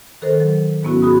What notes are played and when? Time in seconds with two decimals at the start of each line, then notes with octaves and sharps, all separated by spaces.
0.22 D#3 A4 A#4 C5
0.40 F#3
0.83 G#2 F#3 B3 C#4 E4 F#4
1.02 F#4 G#4 B5 D#6